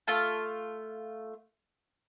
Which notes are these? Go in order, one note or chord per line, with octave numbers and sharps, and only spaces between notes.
A3 F4 F5 A5